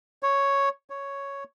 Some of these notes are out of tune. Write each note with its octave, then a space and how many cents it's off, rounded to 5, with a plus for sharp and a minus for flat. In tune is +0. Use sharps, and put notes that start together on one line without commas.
C#5 +0
C#5 +0